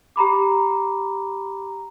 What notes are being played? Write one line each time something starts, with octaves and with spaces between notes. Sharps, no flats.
G4 A#5 B5 D6